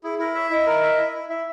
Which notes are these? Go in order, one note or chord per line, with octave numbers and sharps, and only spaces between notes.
E4 G#4
E4 A#4
C#5 E5
E4 D#5
A#4
E5
E4
E4
E4 E5